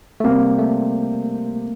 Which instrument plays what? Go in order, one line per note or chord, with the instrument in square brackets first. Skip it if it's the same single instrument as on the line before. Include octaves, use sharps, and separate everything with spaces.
[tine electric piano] A3
[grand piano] C3 G3 C4 [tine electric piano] A#3
[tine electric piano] A3